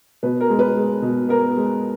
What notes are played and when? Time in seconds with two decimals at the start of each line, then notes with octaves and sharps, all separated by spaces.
0.23 B2 B4
0.41 A#4
0.50 G#3
0.59 B4
0.77 G#3
1.02 B2
1.29 B3 A#4
1.57 G#3